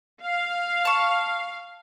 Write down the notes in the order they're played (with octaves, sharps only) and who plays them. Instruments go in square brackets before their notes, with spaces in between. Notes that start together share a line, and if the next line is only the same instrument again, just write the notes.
[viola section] F5
[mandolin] A5 C#6